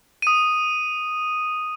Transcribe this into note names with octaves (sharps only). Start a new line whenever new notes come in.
D#6 D#7